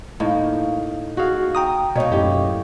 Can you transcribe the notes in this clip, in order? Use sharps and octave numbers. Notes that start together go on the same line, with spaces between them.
A2 A#3 D#4
F#4 G#4 F5
G5 A#5 D#6
B2 A#3 D#4 C#5 D#5
F#2 A2 G4